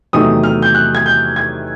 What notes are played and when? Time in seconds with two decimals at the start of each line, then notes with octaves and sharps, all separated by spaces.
0.13 E2 C3 D#3 F#3 A3 D#6
0.43 F6
0.62 G6
0.75 F#6
0.95 G#6
1.06 G6
1.36 G#6